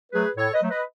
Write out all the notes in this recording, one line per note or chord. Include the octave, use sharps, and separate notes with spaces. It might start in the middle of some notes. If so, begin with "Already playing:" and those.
F#3 A3 G#4 B4
A2 A4 C#5
B4 D#5
F#3 A3
B4 D#5